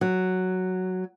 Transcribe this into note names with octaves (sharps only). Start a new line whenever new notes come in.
F#3